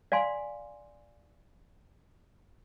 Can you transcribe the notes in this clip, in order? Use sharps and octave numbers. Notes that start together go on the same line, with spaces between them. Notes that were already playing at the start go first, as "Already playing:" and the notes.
D5 F5 G#5 C6